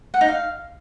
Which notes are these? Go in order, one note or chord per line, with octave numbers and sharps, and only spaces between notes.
F#5
D#4
F5